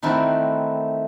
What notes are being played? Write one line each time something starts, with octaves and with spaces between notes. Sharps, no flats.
D#3 A3 C4 E4 F#4 A#4